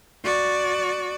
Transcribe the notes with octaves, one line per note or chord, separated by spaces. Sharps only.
F#4 D5